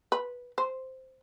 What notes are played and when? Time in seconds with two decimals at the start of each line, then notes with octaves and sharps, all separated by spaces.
0.12 B4
0.58 C5